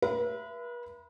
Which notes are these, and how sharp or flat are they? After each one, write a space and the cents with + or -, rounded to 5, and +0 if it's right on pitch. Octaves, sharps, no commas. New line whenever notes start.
B4 -40 E5 +30 B5 +30